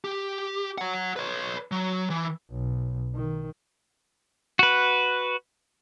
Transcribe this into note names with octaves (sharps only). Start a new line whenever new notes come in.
G4
C#5 F#5
B4 C#5
F#3
E3
B1
D#3
F#4 B4